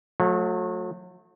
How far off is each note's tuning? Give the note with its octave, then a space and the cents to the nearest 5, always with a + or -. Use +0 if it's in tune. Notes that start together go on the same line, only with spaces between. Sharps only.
F#3 -35 A3 +0